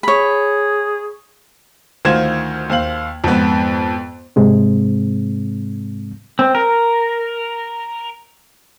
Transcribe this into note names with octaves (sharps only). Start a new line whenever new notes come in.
G#4 C#5 B5
D2 D#3 F4 C5 G#6 E7
D#2 C5 F5 F#7
F2 G#2 B3
G#2 C3 G#3 C4
C4
A#4